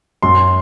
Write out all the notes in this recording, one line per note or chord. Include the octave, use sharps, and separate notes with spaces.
F#2 C6